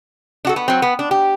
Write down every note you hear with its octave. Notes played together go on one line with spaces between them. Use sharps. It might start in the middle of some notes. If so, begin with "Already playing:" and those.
D4 F#4 A4
B3
F#3 C4
B3
D4
G4